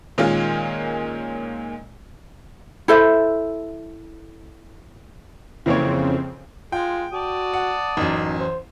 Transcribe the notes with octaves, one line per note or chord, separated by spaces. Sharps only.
A#2 D#3 G#3 A#3 C#4 F4
E4 A4 C5 E5
F2 C#3 E3 A#3 C4 C#5
G#3 F4 G5
F#4 D5 A5 D#6
F#5
A1 F#2 D#4
C5